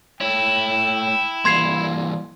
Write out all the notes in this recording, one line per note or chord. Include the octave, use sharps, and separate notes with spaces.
A3 E4 C#5 G5
E3 G3 A#3 C6 G#6 C7